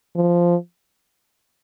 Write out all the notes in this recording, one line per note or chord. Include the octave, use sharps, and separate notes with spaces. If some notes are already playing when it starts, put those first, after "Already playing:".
F3